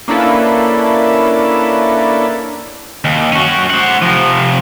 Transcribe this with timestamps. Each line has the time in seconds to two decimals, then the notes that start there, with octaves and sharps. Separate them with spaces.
0.08 A#3 C#4 D4 E4 A4 B4
3.05 D#2
3.32 C#4 F#4
3.70 C5 F#5
4.02 C3 F3